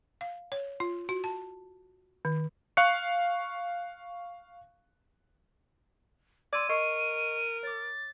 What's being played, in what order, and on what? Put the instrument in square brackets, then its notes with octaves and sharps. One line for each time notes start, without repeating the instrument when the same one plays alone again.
[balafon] F5
C#5
F4
F#4
A5
D#3
[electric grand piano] F5 C#6 F#6 C#7
[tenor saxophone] D5 [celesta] C6 E6 G#6 [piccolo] D#7
[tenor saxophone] A#4 [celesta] D#5 C#6 C7
[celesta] C#5 D6 [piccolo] A6